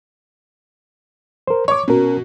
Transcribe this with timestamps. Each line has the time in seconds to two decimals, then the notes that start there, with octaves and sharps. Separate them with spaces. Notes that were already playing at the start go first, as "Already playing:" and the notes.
1.47 A#4 C5
1.68 C#5 C#6 D6
1.88 B2 C#4 A#4